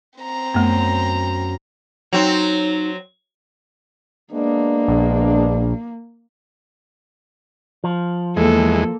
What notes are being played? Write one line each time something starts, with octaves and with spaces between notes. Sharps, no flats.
C4 A#5
F#2 A3 B3
F#3 C4 D#4
G#3 A#3 B3 D4
A#1
F3
E2 G#3 A#3 A4